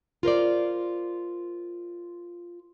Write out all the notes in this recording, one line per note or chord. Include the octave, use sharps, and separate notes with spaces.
F4 A#4 C5 D5